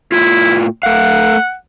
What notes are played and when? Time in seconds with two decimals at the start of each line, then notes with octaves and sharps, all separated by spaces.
0.12 A2 E4 F4
0.83 A3 F5 F#5